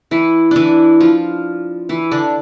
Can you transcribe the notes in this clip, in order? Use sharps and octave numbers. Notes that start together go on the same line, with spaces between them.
E3 E4
E3 D4 E4
F3 F4
E3 E4
D3 D4